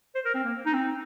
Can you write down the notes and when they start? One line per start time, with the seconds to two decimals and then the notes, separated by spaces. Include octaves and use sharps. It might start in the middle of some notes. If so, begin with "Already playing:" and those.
0.15 C5
0.25 A#4
0.34 C4
0.44 A#3
0.66 D#4
0.73 C4